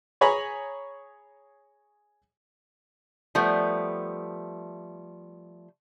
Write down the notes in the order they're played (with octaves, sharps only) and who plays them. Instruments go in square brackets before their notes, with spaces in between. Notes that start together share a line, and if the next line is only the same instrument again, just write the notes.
[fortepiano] G#4 C#5 G#5 A#5 B5 C#6
[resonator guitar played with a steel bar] F3 G3 A3 B3